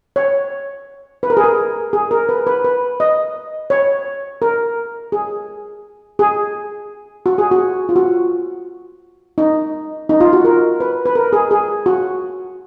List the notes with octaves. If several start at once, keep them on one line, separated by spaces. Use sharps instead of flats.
C#5
B4
A#4
G#4
A#4
G#4
A#4
B4
B4
B4
D#5
C#5
A#4
G#4
G#4
F#4
G#4
F#4
F4
F#4
D#4
D#4
F4
F#4
A#4
B4
B4
A#4
G#4
G#4
F#4